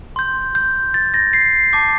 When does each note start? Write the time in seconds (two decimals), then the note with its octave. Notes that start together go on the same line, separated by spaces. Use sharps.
0.16 C6 G6
0.55 G6
0.94 A6
1.14 A#6
1.33 C7
1.73 A5 D6 G6